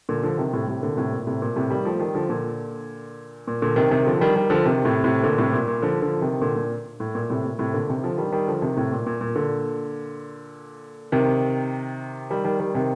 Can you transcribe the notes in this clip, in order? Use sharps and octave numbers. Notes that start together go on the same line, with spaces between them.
A#2 D3
D3 F3
C3 D#3
A2 C3
A2 C3
A#2 D3
A2 C3
A#2
A2 C3
A#2
A2 C3
D#3 G3
F3 A3
D#3 G3
D3 F3
A#2 D3
A#2
A#2 D3
C3 D#3
C3 D#3
D3 F3
D#3 G3
D#3 G3
D3 F3
C3 D#3
A2 C3
A2 C3
A#2 D3
A2 C3
A#2
A#2
D3 F3
D3 F3
C3 D#3
A#2 D3
A#2
A2
A#2
A2 C3
A#2
A2 C3
A#2 D3
C3 D#3
D3 F3
D#3 G3
D#3 G3
D3 F3
C3 D#3
A2 C3
A#2
A#2
A#2
A#2 D3
C3 D#3
D#3 G3
D#3 G3
D#3 G3
C3 D#3